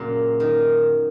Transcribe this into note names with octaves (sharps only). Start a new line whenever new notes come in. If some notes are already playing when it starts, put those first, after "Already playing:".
Already playing: F#2 A#2 C#3
D#3